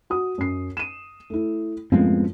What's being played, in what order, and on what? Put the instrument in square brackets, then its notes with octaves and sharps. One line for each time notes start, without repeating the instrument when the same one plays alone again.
[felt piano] F#4 D#6
F#2 C7
D#7 E7
A3 E4
[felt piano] F#2 A2 F3 [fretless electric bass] G#3 B3 C4